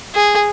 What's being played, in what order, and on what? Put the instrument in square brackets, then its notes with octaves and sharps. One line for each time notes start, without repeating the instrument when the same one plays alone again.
[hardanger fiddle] G#4